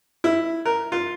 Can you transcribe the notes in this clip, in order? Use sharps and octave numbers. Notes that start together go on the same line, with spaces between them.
E4
A#4
F4